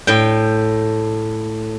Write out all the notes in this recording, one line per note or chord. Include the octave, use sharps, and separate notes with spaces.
A2 G5